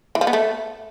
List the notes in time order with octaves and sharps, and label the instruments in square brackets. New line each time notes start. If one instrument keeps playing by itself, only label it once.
[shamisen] E3
F3
B3
A3